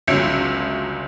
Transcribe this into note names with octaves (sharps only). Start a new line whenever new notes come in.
G1 C#2 F#3 C#4 E5 C#7